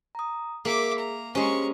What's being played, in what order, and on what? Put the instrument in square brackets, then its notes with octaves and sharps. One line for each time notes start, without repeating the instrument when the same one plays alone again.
[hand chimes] A#5 D#6
[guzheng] A#3 [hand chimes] G#4 [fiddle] E5 D6
[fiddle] A#5
[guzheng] G#3 C#4 [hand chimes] G4 C5 [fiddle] A#5 C#6